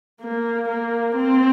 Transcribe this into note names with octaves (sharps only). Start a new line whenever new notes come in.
A#3
A#3
C4